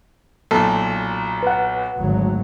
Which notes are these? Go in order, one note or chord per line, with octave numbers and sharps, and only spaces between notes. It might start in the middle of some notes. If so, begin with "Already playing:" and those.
B1 A#2 A4
B4 F#5
G#1 D2 F#3